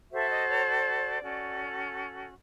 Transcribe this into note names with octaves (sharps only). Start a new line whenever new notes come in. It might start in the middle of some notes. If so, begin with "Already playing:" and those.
F#4 A4 C5 E5
D#5
C#5
D5
C#4 F#4 A4